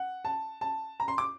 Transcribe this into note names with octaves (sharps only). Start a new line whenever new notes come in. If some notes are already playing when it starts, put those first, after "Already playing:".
Already playing: F#5
A5
A5
A#5
C6
D6